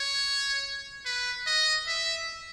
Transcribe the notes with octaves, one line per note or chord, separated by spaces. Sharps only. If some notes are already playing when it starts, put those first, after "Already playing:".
Already playing: C#5
B4
D#5
E5